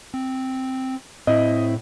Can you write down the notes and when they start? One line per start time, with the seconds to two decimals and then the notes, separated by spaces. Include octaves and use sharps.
0.14 C4
1.27 A2 C4 E4 D#5